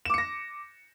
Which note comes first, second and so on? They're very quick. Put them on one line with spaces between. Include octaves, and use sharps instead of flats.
E7 D6 C#7 A#6